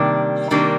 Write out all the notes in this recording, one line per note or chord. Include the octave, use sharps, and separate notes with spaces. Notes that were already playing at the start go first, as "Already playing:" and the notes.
Already playing: C3 D#3 G3 A#3 D4
C3 D#3 G3 A#3 D4